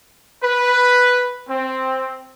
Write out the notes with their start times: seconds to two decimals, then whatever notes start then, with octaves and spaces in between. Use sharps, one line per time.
0.43 B4
1.49 C4